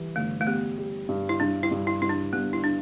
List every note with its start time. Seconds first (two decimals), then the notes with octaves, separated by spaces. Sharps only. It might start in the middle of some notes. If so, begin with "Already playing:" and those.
Already playing: E3 G3
0.16 G1 A3
0.41 A3
0.47 G3 B3
0.78 G3
1.09 G2
1.29 E4
1.40 G2 D4
1.63 E4
1.71 G2
1.87 E4
2.02 G2 E4
2.09 D4
2.33 G2 B3
2.53 E4
2.64 D4